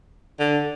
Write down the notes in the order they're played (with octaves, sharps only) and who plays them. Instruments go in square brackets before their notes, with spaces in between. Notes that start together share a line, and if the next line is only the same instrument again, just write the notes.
[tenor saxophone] D3